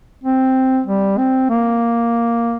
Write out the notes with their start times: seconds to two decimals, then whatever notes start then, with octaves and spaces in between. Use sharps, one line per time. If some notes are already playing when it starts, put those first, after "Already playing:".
0.24 C4
0.87 G3
1.18 C4
1.50 A#3